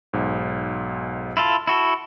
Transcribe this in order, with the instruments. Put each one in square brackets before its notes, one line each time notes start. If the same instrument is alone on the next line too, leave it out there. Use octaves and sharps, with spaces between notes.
[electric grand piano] B1 G#2
[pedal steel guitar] E4 F4 A4
E4 F#4 A4